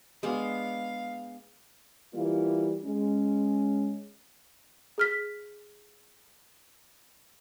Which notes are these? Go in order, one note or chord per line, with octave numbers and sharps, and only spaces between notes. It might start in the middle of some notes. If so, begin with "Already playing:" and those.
G#3 B3 D4 F5
E3 G3 A#3 E4 F4
G#3 C#4
G#4 F6 B6